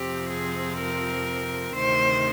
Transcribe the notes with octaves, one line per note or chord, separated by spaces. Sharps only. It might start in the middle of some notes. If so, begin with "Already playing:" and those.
Already playing: F2 C3 F3 C4 G4
G#4
A#4
D2 C3 D#3 C5